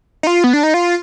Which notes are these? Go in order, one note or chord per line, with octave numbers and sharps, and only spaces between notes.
D#4
F4
B3
D4
D#4
F4